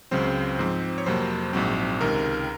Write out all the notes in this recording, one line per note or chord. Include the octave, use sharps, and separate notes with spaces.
C#2 C#3 F#3 C4 C5
G#2 F3 C4
C#5
F2 C3 F#3 A#3 C5
A#1 G#2 F#3 C4
C#2 C3 D#3 A#4